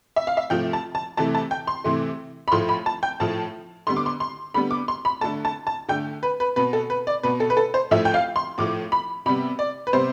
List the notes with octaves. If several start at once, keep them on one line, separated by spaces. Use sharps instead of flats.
E5
F5
E5
C3 F3 A3 G5
A5
A5
C3 E3 A3 A5
A5
G5
C6
C3 E3 A3
B5
A2 F3 A3 C6
B5
A5
G5
A2 F3 A3 A5
D3 G3 B3 C6
D6
C6
C6
D3 G3 B3 B5
D6
C6
B5
D3 A3 A5
A5
A5
D3 A3 G5
B4
B4
B2 B3 B4
A4
B4
D5
B2 B3 B4
A4
B4
A4
C5
A2 F3 A3 E5
G5
F5
C6
A2 F3 A3 D6
B5
C3 G3 B3 B5
D5
B4
C3 G3 B3 C5